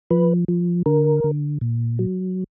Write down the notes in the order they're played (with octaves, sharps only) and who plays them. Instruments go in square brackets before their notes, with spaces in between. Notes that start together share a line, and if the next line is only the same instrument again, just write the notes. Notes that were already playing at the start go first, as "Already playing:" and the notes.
[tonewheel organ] F3 B4
F3
D3 A#4
D3
A#2
F#3